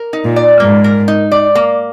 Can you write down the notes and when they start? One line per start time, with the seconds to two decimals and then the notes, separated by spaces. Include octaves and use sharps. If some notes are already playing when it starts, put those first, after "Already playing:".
Already playing: A#4
0.13 D#4
0.24 A#2
0.36 D5
0.60 G#2 A#3
0.84 A#4
1.08 D#4
1.32 D5
1.55 A#3